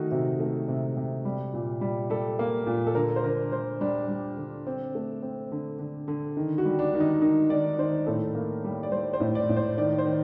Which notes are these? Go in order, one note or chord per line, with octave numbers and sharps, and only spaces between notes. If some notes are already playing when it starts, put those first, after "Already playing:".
Already playing: D#3 A3 D#4 F#4
C3 F#4
A3
C3
C3
G3
A#2
G3
G3 A4
A#3
A#2
A4
D3 A#4
C5
D3 A#4
D3 C5
G3 D4
G3
D3
C4
A3
C4
D3
D3
D3
D#3
F#4
G3
D4
D#3
D#4
D#3 D#4
D#3 D5
D#3 C5
A2 A4
A#3
G3
D5
G3 C5
C5
A2
D5
A2
C5
D#3 D5
C5
D#3